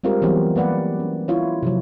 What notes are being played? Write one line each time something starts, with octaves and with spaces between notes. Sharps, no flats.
G3 G#3 C4 F4 G4 A#4
E3 F#3 G3 B3 C4
A#3 B4 D5 F#5
C#4
E4 F4 C#5
C3 F3 F#3